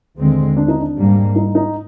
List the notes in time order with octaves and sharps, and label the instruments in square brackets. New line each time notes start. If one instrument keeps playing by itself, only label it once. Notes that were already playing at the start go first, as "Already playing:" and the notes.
[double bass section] D#2 D3 G#3 C4
[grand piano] D4
D#4
D4
[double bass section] G#2 G3 A#3
[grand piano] D#4
D#4